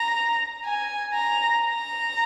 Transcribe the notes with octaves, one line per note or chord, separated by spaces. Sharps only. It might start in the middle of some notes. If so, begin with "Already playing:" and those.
Already playing: A#5
G#5
A#5
A#5